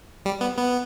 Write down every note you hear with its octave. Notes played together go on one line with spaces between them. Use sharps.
G3
B3
B3